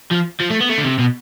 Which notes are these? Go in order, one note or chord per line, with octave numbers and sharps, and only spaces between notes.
F3
F3
A3
B3
A3
D3
C3
B2